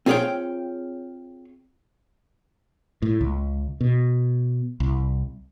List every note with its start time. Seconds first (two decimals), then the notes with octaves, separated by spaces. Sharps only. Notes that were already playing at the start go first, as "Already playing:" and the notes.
0.06 C4 F4 G#4 C#5 F5 G5
3.02 A2
3.21 C#2
3.81 B2
4.80 C2